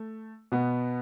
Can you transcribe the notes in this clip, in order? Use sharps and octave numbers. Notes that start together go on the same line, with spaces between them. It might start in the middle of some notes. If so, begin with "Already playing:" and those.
Already playing: A3
B2 B3